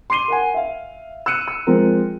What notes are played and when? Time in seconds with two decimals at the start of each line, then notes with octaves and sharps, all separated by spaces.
0.10 C6 D6 C7 D#7 G7
0.28 A#4 F#5 G#5
0.54 E5 F5
1.26 E6 F#6 C#7 D#7
1.48 E6
1.67 F3 G#3 C4 A#4